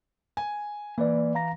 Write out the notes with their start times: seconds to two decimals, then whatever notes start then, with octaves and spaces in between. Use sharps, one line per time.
0.37 G#5
0.98 E3 A#3 B4 D5
1.35 F5 A#5 A#6